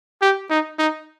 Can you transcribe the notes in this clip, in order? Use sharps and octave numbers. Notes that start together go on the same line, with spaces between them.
G4
D#4
D#4